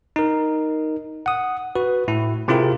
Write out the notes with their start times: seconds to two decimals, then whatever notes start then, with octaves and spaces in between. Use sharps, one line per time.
0.16 D#4 A#4
1.26 F#5 D#6
1.76 F#4 B4
2.08 A2 E4
2.48 C3 C4 E4 F4 G#4 A#4